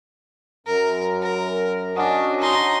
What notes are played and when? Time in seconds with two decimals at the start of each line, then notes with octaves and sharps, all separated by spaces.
0.67 F#2 A#4
1.22 A#4
1.96 C#4 D4 F#4 D#5
2.40 D#4 C6